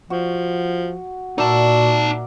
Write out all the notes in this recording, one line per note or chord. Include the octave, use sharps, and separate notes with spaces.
F3 F#4
A#2 D#4 F#4 A#4 D5 E5 A5